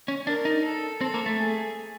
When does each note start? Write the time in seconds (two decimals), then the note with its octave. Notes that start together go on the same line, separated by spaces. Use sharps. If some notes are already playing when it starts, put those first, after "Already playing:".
0.08 C#4
0.27 D4 A#4
0.45 D#4
0.64 A4
1.01 C4 A4
1.14 A#3
1.26 A3
1.39 G#4